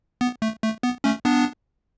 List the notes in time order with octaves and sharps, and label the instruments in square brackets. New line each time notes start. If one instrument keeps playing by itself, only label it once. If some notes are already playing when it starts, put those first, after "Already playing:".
[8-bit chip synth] B3
A3
A3
B3
A3 C#4
B3 D4